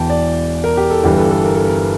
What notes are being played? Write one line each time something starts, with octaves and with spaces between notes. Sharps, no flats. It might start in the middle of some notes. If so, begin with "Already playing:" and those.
Already playing: E1 E2 E3 G5 A5
D5
A#4
G4
A4
G1 G2 E3 G4
A4
A4
A#4
A4
A#4